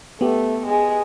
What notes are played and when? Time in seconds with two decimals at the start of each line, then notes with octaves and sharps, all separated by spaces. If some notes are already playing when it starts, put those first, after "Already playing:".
0.21 A3 B3 G4
0.66 G#3 G#4